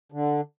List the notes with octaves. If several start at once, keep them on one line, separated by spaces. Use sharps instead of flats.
D3